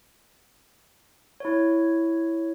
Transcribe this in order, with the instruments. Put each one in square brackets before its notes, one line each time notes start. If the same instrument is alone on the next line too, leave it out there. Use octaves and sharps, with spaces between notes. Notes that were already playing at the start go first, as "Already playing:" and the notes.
[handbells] E4 C#5